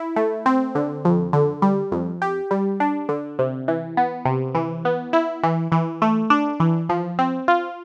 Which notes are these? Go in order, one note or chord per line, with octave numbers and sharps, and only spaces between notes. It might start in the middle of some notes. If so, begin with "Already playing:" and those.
Already playing: E4
A3
C4
D3
F2
D3
G3
F2
G4
G3
D4
D3
C3
E3
B3
C3
E3
B3
E4
E3
E3
A3
D4
E3
F3
C4
F4